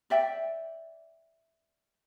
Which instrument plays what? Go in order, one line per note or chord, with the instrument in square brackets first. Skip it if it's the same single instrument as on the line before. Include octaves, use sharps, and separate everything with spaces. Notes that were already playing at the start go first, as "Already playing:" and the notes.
[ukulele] D5 E5 G5